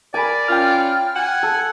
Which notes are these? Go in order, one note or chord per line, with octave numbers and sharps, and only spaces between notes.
A#4 D5 G#5 B5
C#4 F4 G5 F6
F#5 G#5
A4